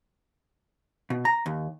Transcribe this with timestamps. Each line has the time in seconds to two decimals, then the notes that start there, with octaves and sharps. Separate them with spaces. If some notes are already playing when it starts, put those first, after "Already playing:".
1.10 B2
1.25 A#5
1.46 D#2